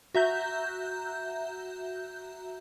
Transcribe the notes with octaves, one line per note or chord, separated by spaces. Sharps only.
F#4 E5 A#5 G6